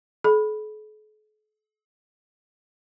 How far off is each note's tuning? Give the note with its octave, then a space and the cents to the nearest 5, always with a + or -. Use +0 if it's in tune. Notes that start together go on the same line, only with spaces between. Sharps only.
A4 -45 B5 +0